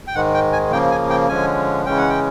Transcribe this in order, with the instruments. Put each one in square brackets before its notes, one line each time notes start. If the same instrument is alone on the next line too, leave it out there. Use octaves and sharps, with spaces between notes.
[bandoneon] G5
G#2 D#3 G#3 F#5
G5
G#5
C#3 F3 A#3 G5
G#5
G5
D3 F3 G#3 C#4 G#5
C#3 E3 G#3 C#4 G5
F#5
G5